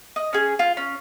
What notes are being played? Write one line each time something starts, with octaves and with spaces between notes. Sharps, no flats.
D#5
C#4 G#4
F4
C#4